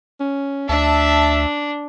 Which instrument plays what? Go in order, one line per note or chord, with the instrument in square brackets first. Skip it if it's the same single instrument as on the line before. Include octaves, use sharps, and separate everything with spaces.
[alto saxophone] C#4
[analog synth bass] D2 [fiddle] D4 [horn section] E5 [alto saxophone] A5